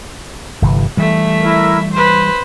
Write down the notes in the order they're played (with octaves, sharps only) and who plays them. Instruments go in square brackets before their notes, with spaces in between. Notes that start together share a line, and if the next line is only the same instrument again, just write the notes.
[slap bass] G1 C3 E3
[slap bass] E3 G3 [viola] A3 E5
[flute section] E4 A#4
[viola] B4 C5 [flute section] C6